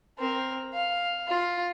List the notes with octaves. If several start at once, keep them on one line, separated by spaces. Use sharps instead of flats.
C4 A#4
F5
F4